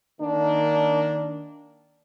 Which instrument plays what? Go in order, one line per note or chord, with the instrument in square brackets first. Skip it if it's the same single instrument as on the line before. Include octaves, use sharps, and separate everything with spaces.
[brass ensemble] D#3 A#3 D4